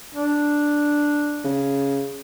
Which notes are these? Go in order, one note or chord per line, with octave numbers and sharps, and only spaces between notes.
D4
C#3